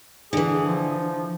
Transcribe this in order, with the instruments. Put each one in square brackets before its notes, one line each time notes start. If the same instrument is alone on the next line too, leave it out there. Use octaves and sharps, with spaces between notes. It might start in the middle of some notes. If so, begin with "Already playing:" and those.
[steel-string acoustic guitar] D3 E3 [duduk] G#4
[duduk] F3